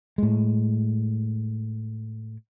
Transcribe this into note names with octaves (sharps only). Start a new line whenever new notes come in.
A2 G#3